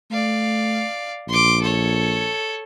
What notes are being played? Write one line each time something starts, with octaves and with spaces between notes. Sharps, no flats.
A3 D5 F5
A#1 C6 D6
A4 C#5